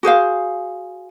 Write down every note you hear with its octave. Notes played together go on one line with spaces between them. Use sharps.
F#4 G#4 C5 F5